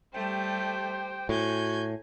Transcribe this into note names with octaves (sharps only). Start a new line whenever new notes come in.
G3 A3 G4 C5 G5
A2 F#4 G#5 G6 G#6